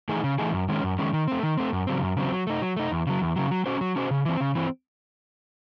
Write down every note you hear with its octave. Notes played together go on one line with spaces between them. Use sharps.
E3 A3 D#4 G#4
C#3
E3 A3 D#4 G#4
F#2
D#3 G#3 C#4
F#2
D#3 G#3 C#4
D#3
A3 C4
D#3
A3 C4
F#2
C#3 F#3 C4
F#2
C#3 F#3 C4
F#3
A3 D#4
F#3
A3 D#4
E2
C#3 F#3
E2
C#3 F#3
F#3
C#4 F#4 C5
F#3
C#4 F#4 C5
C#3
E3 C4
C#3
E3 C4